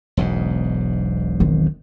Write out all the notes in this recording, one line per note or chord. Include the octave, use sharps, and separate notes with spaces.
E1 B1 G#2
D#3 C4